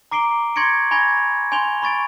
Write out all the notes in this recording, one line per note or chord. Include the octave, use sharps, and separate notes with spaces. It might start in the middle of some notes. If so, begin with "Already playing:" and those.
A#5 D6 C7 D7 G7
C6 C#6 G#6 A#6 C#7 D7
G#5 B5 C#6 G#6 A#6
G#5 C6 G6 F7 G7
B5 C#6 A6 D7